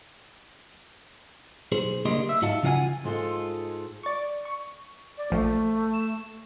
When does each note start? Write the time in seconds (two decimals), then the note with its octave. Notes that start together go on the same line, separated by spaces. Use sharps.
1.72 B1 G#4 C5
2.05 C#2 D3 A#3 G4 D#5 C6
2.29 E5
2.42 G#2 F#4 D#5 F5 A5
2.63 C#3 F3 F4 F5 F#5 G#5
3.04 G#2 G#3 F4 A4
4.03 D5 C#6
4.45 C#6
5.18 D5
5.32 A#1 F3 A3
5.94 E7